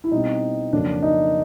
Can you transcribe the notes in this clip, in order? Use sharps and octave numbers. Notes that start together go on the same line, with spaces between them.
E4
B2 G3 C4 D#4
F2 C#3 F#3 A#3 D4
D#4